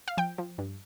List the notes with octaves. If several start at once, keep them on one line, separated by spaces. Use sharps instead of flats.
F5
F3 G5
F3
G2